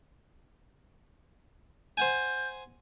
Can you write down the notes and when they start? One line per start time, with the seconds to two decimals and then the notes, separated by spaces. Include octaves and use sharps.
1.97 C5 F#5 G#5 G6